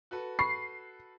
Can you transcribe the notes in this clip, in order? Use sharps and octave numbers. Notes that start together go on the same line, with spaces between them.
F#4 A4 B4
B5 C#6 C7